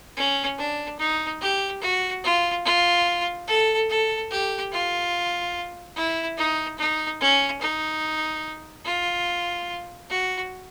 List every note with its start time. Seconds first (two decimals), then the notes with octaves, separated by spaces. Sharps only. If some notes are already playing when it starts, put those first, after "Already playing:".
0.17 C#4
0.58 D4
0.99 D#4
1.41 G4
1.82 F#4
2.24 F4
2.65 F4
3.48 A4
3.90 A4
4.31 G4
4.72 F4
5.96 E4
6.38 D#4
6.79 D#4
7.21 C#4
7.61 D#4
8.85 F4
10.10 F#4